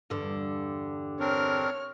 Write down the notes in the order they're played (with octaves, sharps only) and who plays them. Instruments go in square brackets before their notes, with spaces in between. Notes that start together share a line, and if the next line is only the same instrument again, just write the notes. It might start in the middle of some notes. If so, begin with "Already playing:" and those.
[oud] E2 G2 D3
[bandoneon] C4 D4 A#4 [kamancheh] C#5 F6